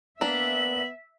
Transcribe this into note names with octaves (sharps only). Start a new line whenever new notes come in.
A#3 B3 D4 E5 F#7